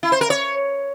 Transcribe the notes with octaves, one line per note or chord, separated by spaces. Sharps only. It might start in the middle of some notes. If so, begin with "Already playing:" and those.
E4
C5
A#4
C#5